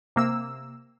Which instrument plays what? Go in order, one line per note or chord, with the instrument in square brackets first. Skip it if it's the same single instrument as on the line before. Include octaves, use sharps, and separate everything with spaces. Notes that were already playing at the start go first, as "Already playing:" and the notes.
[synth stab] C3 A#3 E6